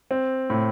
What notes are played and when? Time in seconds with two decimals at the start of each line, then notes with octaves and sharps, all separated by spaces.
0.11 C4
0.50 A2